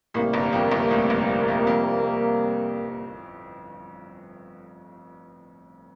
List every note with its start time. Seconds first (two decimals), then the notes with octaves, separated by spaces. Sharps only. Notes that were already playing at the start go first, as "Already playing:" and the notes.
0.14 A1 A2 C3 G3 A#3
0.33 G1 G2
0.53 F2
0.71 G1 G2
0.91 A1 A2
1.10 G1 G2
1.48 F2
1.67 F2